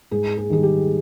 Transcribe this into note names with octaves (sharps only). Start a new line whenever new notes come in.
G#2 G#4
G#4
D#3 G3 G#4
G4